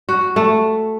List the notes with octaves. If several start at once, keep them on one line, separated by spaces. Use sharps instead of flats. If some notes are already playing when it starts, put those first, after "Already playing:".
F#4
A3